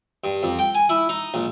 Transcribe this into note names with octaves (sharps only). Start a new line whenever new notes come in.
G2
F2
G5
G#5
E4
D#4
A#1